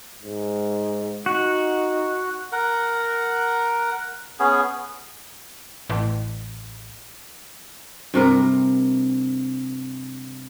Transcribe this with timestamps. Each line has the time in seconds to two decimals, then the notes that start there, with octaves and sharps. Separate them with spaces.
0.23 G#2
1.26 D#4 F#4
2.52 A#4 F#5
4.40 B3 C#4 G#4
5.90 A1
8.14 G2 C3 A#4